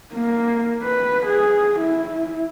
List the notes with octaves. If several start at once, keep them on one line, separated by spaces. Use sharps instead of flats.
A#3
B4
G#4
E4